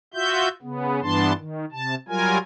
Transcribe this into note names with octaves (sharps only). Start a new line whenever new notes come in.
F4 F#4 E5 G6
C#3 B3
G2 E3 B3 D4 A5 C6
D#3
C3 A5
F#3 G3 F4 A#4 G#5